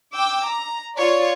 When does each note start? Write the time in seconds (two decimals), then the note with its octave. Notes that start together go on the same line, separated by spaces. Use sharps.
0.14 G5 D6 E6
0.47 A#5
0.96 F4 C#5 D5